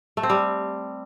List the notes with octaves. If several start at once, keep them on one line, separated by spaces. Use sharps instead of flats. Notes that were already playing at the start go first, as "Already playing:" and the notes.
A3
C4
G3